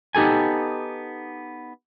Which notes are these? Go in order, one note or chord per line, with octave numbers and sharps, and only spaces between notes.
B3 D#4 G4 A4 G#5